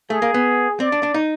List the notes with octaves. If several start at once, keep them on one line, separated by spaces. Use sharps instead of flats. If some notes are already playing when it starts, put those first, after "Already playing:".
A3 G#4
A#3
B3
C4 D5
D4
D4
D#4